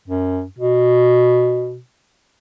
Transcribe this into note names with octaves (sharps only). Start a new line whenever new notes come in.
F#2
B2